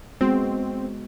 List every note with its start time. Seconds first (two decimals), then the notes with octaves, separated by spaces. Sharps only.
0.21 G#3 B3 C4 F#4